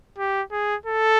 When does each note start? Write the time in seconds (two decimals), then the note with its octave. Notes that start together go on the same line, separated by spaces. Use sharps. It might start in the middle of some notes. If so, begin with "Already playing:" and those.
0.18 G4
0.52 G#4
0.86 A4